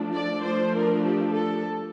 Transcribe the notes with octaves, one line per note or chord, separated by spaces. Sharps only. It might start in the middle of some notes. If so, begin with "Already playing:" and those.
Already playing: F3 A3 D4
D5
F3 A3 D4 C5
A#4
G4
A4